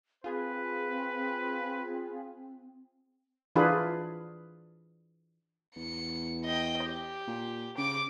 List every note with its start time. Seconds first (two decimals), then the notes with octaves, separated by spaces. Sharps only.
0.24 C4 F4 G#4 B4
3.56 E3 D4 F4 G#4 B4
5.76 E2 C#7
6.45 D#5 G5
6.84 G4
7.27 A#2
7.78 C#3 D6 D7